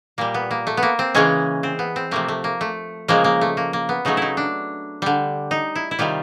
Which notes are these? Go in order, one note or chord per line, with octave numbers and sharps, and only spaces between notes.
A#2 G3 A#3
B3
A#3
A3
B3
A#3
C4
C#3 E3 G#3 C#4
C4
B3
C4
C3 F3 A3 A#3
A3
A#3
A3
C#3 F3 G#3 A#3
A#3
A3
A#3
A#3
B3
C#3 F#3 A3 D#4
D#4 E4
D4
D3 G3
D#4
E4
E4
C3 D#3 G3 F4